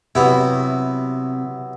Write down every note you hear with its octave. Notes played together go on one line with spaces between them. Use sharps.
C3 F#3 B3 E4